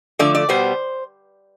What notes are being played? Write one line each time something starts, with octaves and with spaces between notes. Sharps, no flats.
D3 F3 A3 D5
D5
B2 G3 B3 C5